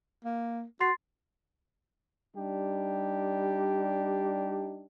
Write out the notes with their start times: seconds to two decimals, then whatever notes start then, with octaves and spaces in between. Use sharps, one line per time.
0.25 A#3
0.80 F#4 C6 A6 C7
2.36 G3 D4 D#4 G4